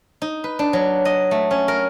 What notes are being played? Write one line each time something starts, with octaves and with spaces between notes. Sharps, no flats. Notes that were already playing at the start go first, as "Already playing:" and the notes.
D#4
B4
D4
F#3
D#5
A3
C#4
A#4